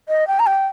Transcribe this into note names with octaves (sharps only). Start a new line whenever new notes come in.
D#5
G5
A#5
G5